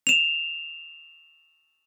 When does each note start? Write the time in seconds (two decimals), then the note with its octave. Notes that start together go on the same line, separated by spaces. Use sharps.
0.07 E7 F7